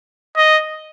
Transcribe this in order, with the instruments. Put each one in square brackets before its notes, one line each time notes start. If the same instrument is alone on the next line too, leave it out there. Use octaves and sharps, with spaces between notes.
[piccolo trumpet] D#5